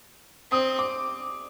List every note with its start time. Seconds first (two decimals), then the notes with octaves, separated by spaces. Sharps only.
0.51 C4 D#6
0.79 D6